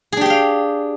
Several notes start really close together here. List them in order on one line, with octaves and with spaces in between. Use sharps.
G#4 D4 G4 G5 F5